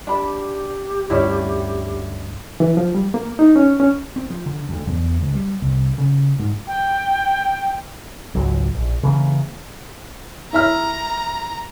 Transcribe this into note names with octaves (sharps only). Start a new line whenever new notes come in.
D4 G4 B5
D2 G2 D3 C#4 D4 E4
E3
F3
G3
A#3
D#4
C#4
C#4
C4
F3
D3
D2
E2
C#2
G3
C2
C#3
G#2
G5
G#1 C#2 F#3
A#1
C#3 E3 A#3
E4 E5 A#5 F6